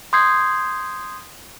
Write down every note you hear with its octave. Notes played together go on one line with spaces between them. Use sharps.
C6 D#6 G6 G#6 C7